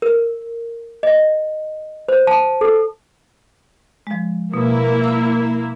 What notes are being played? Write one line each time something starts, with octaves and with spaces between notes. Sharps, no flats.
A#4
D#5
C5
A5
A4
F3 G#3
B2 A#3 E4
E6